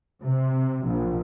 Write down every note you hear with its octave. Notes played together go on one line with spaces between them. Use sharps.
C3
A#1